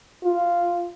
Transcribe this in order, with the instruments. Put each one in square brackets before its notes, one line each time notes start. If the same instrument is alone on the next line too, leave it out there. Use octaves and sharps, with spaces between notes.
[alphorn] F4